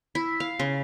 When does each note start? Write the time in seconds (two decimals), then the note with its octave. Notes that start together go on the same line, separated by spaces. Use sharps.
0.15 E4
0.40 F5
0.59 C#3